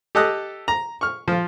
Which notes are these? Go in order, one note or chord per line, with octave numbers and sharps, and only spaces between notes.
G4 A4 D#5 D#6 F#6
A#5
C#6 F6
F3 F4